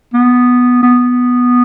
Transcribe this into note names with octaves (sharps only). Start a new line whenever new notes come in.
B3
B3